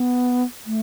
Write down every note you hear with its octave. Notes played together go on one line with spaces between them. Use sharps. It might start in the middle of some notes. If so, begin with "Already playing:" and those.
Already playing: B3
A3